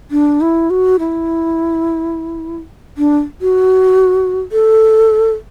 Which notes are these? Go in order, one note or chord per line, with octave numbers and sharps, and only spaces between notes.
D4
E4
F#4
E4
D4
F#4
A4